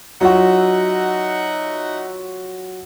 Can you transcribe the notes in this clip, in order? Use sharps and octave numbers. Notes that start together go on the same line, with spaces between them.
F#3 D#4 F4 F#4 E5 F#5